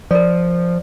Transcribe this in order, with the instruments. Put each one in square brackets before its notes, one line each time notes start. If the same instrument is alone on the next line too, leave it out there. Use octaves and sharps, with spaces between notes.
[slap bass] F3 [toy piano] A#4 D5